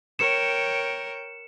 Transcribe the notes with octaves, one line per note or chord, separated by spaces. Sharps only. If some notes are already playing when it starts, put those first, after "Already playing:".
A#4 C#5 G5 C#7 E7